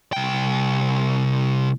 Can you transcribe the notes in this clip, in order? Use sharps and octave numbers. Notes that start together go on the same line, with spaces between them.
C2 G5